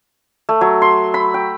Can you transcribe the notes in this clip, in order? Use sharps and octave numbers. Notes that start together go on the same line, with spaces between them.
A3
F#3
C6
B5
G5